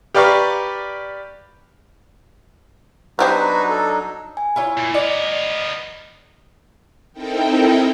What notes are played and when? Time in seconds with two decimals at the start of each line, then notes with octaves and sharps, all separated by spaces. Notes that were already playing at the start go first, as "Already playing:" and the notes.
0.15 G4 B4 D5 F5 A#5 C#6
3.19 F#3 B3 D4 D#4 F#4 G4 B4 C5
3.69 A4
4.37 G#5
4.56 E4 F4 C#5
4.77 A#2
4.94 B3 A#4 D5 D#5
7.13 C4 D#4 E4 A4 A#4 G5